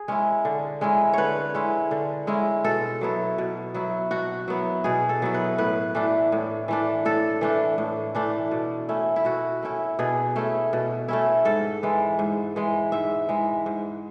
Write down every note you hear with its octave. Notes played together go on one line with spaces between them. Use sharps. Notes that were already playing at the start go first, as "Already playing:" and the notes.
Already playing: G#4
G#3 C#4 E4
D3
G#3 C#4 E4
D3 B4 C#5
G#3 C#4 E4
D3
G#3 C#4 E4
B2 A4
F#3 B3 E4
B2
F#3 B3 E4
B2 F#4
F#3 B3 E4
B2 G#4
A4
F#3 B3 E4
B4
A2 B4
E3 A3 D4
A2
E3 A3 D4
A2 A4
E3 A3 D4
A2
E3 A3 D4
B2
A3 C#4 E4
E4
B2 F#4
A3 C#4 E4
B2 G#4
A3 C#4 E4
B2
A3 C#4 E4
G#2 A4
E3 G#3
G#2
E3 G#3
G#2 E5
E3 G#3
G#2